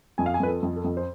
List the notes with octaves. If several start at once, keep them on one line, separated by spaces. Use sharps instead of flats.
F2 G#5
F5
G#5
F2 B4
A4
F2
A4
F2
C5